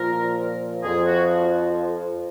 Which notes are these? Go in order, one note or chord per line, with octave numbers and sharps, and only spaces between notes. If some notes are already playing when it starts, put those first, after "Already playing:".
Already playing: A#2 F3 A#4
F2 F3 G#4
F#4